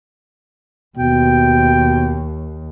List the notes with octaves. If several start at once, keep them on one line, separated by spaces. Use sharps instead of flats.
D#2 B2 G5